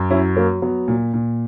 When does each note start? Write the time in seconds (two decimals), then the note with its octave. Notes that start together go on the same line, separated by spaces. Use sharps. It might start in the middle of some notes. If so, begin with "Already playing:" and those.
Already playing: F#2
0.11 F#3 C#4 E4
0.36 F#3 A#3 C#4
0.62 F#3 B3
0.88 A#2
1.14 A#2